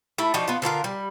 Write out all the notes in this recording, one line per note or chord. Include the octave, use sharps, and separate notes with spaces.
A3 E4
F3 D4 D#4 F#4
B3 F4
D3 B3 F4 A#4
G3